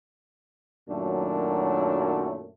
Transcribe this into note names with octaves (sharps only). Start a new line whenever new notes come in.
F#2 A#2 D#3 F#3 A3 D4